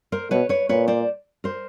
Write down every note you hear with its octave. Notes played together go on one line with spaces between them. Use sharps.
A#4 C5
B2 B4 C#5
B4 C#5
A#2 B4 C#5
C5 D5
A#4 C5